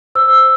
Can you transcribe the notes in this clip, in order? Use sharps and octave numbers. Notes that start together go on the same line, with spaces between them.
C5 E6